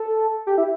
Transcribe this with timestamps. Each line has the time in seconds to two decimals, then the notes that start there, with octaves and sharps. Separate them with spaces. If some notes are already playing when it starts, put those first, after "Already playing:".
Already playing: A4
0.47 G4
0.58 E4